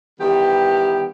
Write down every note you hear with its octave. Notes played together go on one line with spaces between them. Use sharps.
D#3 E3 G3 B3 G4